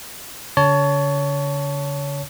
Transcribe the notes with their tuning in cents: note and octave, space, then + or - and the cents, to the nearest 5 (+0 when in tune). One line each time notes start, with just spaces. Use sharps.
D3 -45 C#5 +20 A5 +0